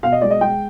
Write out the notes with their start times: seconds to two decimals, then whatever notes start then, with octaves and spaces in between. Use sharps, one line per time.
0.03 B2 F5
0.12 D#5
0.21 G#3 D5
0.31 D#5
0.41 G#3 G5